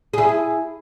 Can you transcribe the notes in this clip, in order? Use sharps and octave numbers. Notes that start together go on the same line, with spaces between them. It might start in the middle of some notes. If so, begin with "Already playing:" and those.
E4 G#4